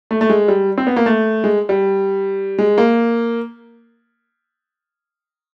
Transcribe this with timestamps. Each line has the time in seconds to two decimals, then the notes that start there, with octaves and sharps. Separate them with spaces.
0.11 A3
0.21 A3
0.29 G#3
0.48 G3
0.78 C4
0.87 B3
0.96 A#3
1.06 A3
1.44 G#3
1.69 G3
2.59 G#3
2.78 A#3